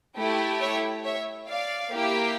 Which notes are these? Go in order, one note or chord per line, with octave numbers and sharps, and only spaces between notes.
A3 E4 G4
C#5 E5
C#5 E5
D5 F5
A#3 E4 G4